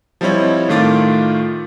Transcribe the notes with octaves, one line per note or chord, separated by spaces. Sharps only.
F3 G3 C4 E4 C#5 D#5
A2 D#3 A3 F4 D6 A6